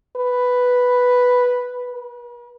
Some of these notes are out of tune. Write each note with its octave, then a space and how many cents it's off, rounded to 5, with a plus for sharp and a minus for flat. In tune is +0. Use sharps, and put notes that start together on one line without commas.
B4 +0
B4 -45